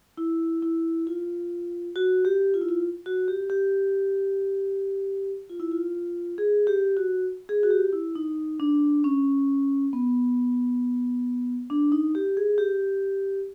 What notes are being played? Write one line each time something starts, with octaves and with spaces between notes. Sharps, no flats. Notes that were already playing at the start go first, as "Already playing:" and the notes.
E4
E4
F4
F#4
G4
F4
E4
F4
F#4
G4
G4
F4
E4
F4
G#4
G4
F#4
G#4
F#4
G4
E4
D#4
D4
C#4
B3
D4
D#4
G4
G#4
G4